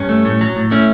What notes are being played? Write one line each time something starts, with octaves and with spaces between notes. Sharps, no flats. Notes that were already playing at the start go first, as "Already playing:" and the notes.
Already playing: G2 C#4
A3
A2
F#3
A2
A3 C#4 E4